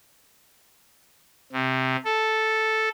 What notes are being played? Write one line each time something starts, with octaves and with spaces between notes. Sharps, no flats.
C3
A4